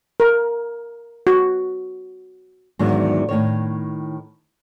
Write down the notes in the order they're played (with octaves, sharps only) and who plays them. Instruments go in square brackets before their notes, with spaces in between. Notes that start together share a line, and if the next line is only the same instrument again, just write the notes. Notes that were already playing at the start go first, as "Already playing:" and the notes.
[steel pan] A#4
F#4
[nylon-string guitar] E2 G#2 D3 D#3 F#3
A2 D#3 C#5